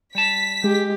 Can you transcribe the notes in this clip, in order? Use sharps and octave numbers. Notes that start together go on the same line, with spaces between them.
G3 A5 B6
G#3 G4